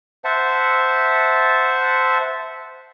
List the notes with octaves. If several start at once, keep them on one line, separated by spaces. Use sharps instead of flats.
C5 E5 F#5 A5